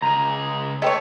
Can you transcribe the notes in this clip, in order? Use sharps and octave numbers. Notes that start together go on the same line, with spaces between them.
C#2 G#4 A#5
A3 C5 C#5 D#5 G5